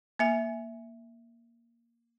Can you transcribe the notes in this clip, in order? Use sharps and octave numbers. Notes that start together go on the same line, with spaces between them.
A#3 E5 G#5